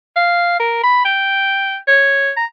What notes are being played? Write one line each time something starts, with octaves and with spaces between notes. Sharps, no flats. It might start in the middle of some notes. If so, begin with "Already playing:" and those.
F5
A#4
B5
G5
C#5
A#5